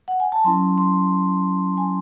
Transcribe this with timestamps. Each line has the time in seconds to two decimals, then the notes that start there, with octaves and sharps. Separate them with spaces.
0.08 F#5
0.20 G#5
0.32 A5
0.44 F#3 C#4 E4 C6
0.78 C6
1.77 G#5